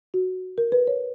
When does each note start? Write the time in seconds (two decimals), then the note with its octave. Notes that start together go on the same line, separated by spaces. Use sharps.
0.14 F#4
0.58 A#4
0.72 B4
0.87 C#5